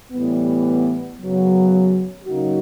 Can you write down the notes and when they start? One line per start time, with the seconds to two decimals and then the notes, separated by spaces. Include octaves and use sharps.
0.12 A2 E3 G3 B3
1.18 F#2 C#3 F#3 B3
2.24 C#3 F#3 A#3 D#4 F#4